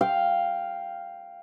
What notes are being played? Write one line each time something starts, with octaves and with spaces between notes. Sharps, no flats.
F5 G5